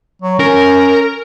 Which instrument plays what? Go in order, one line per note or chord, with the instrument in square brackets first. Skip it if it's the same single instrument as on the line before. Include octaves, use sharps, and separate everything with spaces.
[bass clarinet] F#3
[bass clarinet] C#4 [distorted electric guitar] A#4